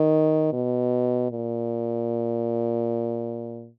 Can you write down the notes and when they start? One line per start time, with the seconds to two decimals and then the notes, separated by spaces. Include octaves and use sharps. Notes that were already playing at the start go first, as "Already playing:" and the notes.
Already playing: D#3
0.53 B2
1.31 A#2